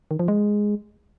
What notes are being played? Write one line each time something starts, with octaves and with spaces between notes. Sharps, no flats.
D#3
F3
G#3